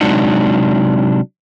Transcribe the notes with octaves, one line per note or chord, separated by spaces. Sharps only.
C3 F#3 G#3 D4 D#4 F#5